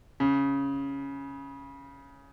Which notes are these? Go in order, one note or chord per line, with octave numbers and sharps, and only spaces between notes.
C#3